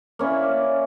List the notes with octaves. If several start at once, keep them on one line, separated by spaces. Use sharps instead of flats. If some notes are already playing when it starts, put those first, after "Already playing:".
A#3 C#4 E4 D5